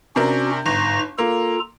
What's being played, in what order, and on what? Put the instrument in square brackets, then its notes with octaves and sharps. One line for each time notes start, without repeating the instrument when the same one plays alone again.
[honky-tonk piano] C3 D4 A#4 [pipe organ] C#4 F#4
[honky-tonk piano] G1 [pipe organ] G#2 A#5 A#6
[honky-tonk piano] A#3 [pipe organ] F4 A4 A#5